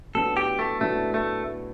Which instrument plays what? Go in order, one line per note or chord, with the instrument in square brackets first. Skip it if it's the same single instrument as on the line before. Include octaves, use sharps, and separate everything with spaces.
[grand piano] A2 F#3 B3 D4 F#4 [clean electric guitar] A4
[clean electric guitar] G4
A3
[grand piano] A2 F#3 B3 D4 F#4 [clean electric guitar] A3
[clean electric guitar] A3